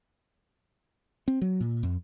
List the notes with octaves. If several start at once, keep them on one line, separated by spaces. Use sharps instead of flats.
C4
F#3
A#2
F2